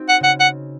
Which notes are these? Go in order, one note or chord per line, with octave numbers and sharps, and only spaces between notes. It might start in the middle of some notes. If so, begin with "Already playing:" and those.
Already playing: C4 D#4 F#4
F#5
C#3 F#5
F#5